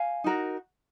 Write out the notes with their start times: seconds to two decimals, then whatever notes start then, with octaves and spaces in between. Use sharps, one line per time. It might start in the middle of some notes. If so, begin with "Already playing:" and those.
Already playing: F5 G#5
0.24 D#4 F#4 A#4